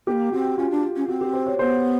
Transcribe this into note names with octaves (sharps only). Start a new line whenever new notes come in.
A#3 B3 G4
C4 F#4
C#4 F4
D4
C#4
C4 F#4
G4
C5
C#5
B3 C5